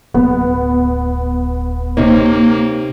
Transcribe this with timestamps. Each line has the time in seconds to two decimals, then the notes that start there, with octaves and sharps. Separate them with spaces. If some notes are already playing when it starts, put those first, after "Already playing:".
0.14 D1 B3
1.97 C3 A#3 D#4 C#5